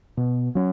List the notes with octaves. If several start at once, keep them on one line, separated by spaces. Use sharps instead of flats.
B2
F#3 C#4